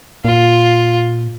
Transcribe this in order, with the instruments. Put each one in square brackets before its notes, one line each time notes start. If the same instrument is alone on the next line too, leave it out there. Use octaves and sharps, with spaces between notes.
[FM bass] A#2 [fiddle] F4